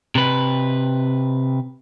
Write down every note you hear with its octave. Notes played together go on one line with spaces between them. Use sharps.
C3 B4